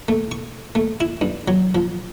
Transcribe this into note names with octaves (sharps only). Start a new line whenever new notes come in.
A3
C#6
A3
E4
G2
F#3
F3